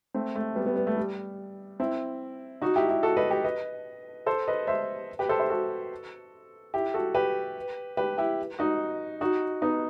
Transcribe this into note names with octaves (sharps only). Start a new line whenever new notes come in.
A3 C4
A3
G3 B3
G3 B3
G3 B3
A3
G3
C4 E4
D#4 F#4
E4 G4
E4 G4
F#4 A4
B4 D#5
G4 B4
B4 D#5
A4 C5
B4 D#5
C5 E5
G4 B4
A4 C5
C5 E5
F#4 A4
E4 G4
F#4 A4
G4 B4
G4 B4
E4 G4
D#4 F#4
D#4 F#4
B3 D#4